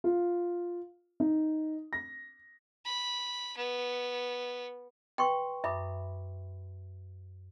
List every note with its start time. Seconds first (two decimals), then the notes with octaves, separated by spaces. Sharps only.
0.04 F4
1.20 D#4
1.93 A#6
2.86 B5
3.57 B3
5.18 B4 G5 C6 C#6
5.64 F#2 E5 B5 D6 D#6